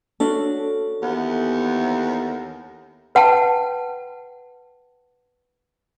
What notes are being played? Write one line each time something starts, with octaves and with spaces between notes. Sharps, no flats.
C#4 D4 F#4 A4
D#2 E3 B3
B4 F#5 G5 A5